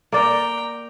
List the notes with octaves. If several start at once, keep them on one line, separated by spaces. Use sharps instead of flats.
A#3 D5 G5 A#5